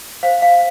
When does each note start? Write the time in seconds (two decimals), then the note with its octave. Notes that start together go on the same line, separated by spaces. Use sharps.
0.23 C5 F5
0.42 F5